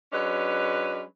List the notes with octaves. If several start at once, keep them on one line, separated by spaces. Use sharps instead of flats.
F#3 G#3 C#4 D4 B4